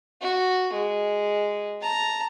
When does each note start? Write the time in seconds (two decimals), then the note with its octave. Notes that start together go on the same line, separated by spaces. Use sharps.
0.22 F#4
0.73 G#3
1.81 A5 A#5